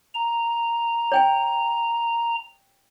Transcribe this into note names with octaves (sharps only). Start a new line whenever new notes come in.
A#5
C#5 G5 G#5